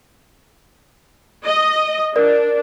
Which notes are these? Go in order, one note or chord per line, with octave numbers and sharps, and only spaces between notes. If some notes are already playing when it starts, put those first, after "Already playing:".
D#5
D4 A#4 D5